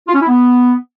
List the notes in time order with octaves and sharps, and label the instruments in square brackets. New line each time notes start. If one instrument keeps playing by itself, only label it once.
[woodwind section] F4
C#4
E4
B3